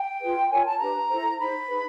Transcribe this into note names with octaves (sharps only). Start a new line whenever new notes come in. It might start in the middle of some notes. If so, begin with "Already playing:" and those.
Already playing: G5
F4 G#4 B4
F4 A#4 C#5 G#5
A5
D4 G4 B4 A#5
E4 A4 C5
D#4 G#4 C5 B5
D#4 G#4 B4